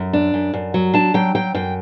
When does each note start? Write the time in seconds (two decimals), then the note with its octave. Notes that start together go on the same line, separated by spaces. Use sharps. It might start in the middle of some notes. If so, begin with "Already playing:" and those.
Already playing: F#2
0.13 D4
0.34 F#2
0.53 F#2
0.74 F#3
0.94 D4 A5
1.14 F#3 G5
1.35 F#3 G5
1.54 F#2 G5